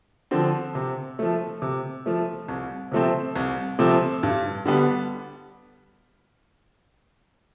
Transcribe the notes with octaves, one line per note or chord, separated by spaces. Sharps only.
D3 F3 C4
C3
F3 A3
C3
F3 A3
C2
C3 F3 A3 C4
C2
C3 F3 A3 C4
G2
D3 G3 B3